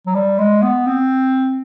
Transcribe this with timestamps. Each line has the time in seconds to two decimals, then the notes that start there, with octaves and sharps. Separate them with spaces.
0.06 F#3
0.15 G3
0.38 G#3
0.63 B3
0.87 C4